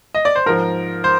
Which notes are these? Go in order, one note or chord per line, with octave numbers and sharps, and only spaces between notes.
D#5
D5
C5
G#2 F3 A#4
C5